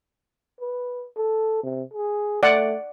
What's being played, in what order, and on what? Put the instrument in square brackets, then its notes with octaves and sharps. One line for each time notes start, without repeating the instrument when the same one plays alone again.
[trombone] B4
A4
C3
G#4
[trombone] A3 [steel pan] D5 F#5